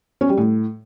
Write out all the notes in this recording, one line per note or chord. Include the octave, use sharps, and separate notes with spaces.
C#4
G3
A2